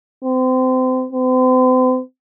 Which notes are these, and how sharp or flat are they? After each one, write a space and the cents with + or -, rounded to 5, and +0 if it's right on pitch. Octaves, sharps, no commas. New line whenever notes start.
C4 -30
C4 -40